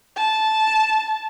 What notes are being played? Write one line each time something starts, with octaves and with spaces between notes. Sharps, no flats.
A5